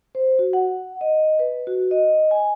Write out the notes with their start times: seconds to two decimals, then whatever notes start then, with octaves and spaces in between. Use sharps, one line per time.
0.15 C5
0.39 F#4
0.53 F#5
1.01 D#5
1.39 B4
1.67 F#4
1.91 D#5
2.31 G#5